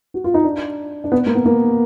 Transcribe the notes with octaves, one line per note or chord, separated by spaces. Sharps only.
F#4
F4
D#4
D4
D4
B3
A#3
B3
A#3